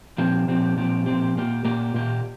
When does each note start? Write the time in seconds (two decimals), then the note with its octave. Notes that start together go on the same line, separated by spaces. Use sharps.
0.18 A#2 F3 C4 G4
0.48 A#2 F3 C4 G4
0.77 A#2 F3 C4 G4
1.06 A#2 F3 C4 G4
1.35 A#2 A#3 G4
1.65 A#2 A#3 G4
1.94 A#2 A#3 G4